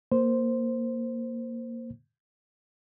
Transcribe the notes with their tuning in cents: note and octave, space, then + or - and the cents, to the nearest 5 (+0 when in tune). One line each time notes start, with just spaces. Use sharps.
A#3 +0 C5 +0